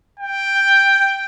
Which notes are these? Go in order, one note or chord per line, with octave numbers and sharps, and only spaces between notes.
G5